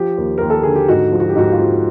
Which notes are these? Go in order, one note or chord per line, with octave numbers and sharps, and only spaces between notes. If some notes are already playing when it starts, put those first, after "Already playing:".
Already playing: F3 G4
D#2
D#2 A#4
A4
D3 G#4
G4
G#2 F#4
F3
F#4
G4
G#2 F#4
F4
F3